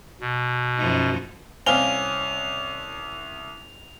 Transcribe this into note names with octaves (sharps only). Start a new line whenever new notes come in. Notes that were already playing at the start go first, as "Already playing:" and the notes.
B2
F#2 F3 D#4
C2 C4 C#4 F5 F7 G7